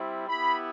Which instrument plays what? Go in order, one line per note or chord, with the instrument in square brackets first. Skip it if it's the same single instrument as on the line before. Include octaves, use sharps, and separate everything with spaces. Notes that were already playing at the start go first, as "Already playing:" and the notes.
Already playing: [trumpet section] G3 C4 E4
B3 E4 G4 B5